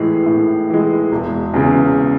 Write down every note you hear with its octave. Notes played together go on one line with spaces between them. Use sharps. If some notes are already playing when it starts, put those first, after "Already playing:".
Already playing: A2 E3 G#3
A2
E3 G#3
E1
E2 C#3